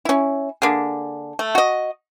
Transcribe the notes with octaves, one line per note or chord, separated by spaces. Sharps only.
C#4 E4
D3 A#3 G#4
A3
F#4 D#5